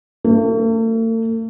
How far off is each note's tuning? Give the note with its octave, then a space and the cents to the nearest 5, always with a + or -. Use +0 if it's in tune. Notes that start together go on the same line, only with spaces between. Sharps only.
A3 +45